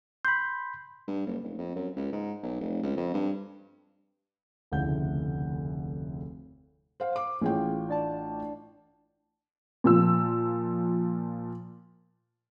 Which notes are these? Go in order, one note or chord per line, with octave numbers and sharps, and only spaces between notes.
B5 C6 G6
G2
F#1
F1
F2
F#2
C#2
G#2
B1
F1
C#2
F2
G2
F1 D2 C#3 E4 F#5 G6
C5 F5
D6
A1 C#4 F4 G#4 C#5 G5
D4 D5 A5
A#2 F3 E6